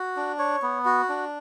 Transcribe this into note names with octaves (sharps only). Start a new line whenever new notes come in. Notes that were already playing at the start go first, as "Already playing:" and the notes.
Already playing: F#4
D4
C#5
B3
F#4
D4